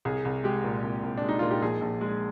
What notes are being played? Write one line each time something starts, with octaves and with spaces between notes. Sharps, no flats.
C2 G#4
C2
G#3 G4
A#2
C2
C2
D4
G#3
D#4
A#2 F4
G4
A#1 G#4
A#1
G#3 G#4